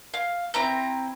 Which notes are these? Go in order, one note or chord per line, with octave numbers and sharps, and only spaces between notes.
F5
C4 E4 A#5 G6